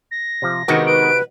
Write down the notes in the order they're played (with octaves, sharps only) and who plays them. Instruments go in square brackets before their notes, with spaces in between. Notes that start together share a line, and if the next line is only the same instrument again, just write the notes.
[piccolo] A#6
[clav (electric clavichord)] C3 F3
[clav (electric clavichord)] C3 D#4 F#4 [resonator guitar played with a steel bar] D#3 G#3 B3
[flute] B4 [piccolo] D7